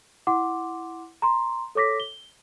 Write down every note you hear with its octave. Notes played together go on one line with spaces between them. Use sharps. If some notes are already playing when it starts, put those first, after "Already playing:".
E4 F#5 C6 D6
A#5 C6
A4 C#5 D6 A#6 B6
G7